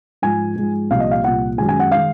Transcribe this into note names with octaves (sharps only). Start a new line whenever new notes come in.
G#2 F3 G#3 G#5
G#2 F3 G#3
C2 A#2 F3 F5
D#5
F5
C2 A#2 F3 F#5
F#2 D#3 G#3 G#5
G#5
F#5
D#3 G#3 F5